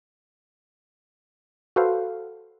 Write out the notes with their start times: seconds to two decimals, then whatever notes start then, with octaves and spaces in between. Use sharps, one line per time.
1.76 F#4 A4 B4 C5 F5